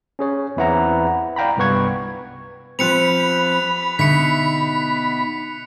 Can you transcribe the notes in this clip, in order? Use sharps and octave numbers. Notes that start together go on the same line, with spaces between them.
C#4 G#4 C#5
E2 C4 E4 B4 F#5 A#5
D5 F5 G5 A#5 B5
C2 G2 B3 B4 C#6 G#6
F3 C4 B5 F#6 C#7 F7
B2 D3 D#4 E5 B6 C#7